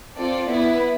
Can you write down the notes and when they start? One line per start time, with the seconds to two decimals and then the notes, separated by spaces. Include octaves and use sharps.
0.18 C4 F4 A4 D5
0.49 B3 E4 B4